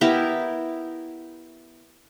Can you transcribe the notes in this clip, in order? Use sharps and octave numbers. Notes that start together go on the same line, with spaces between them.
B3 E4 G4 A#4